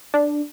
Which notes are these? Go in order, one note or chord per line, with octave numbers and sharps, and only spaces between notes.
D4